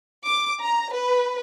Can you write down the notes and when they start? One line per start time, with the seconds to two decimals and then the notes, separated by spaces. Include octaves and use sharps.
0.24 D6
0.63 A#5
0.94 B4